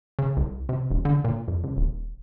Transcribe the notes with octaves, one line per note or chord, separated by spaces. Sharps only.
C#3
C2
C3
E1
D3
A#2
F2
C#2
D#1